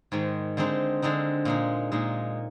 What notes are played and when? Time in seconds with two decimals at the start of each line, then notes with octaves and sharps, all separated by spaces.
0.12 G#2 D#3 G#3
0.57 D3 G#3 C4 D#4
1.02 D3 G#3 C4 D#4
1.45 A#2 G#3 D#4
1.92 A#2 G#3 D#4